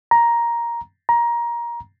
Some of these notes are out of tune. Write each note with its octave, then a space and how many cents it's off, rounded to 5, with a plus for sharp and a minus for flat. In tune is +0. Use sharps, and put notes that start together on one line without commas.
A#5 +10
A#5 +20